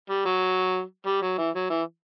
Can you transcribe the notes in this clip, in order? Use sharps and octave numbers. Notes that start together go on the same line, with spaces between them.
G3
F#3
G3
F#3
E3
F#3
E3